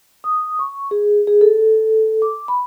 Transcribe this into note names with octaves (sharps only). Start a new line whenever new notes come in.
D#6
C#6
G#4
G#4
A4
D6
B5